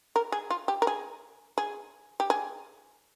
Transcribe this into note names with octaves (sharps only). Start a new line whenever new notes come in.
A#4
G#4
F4
G4
A#4
G#4
G#4
G4
G#4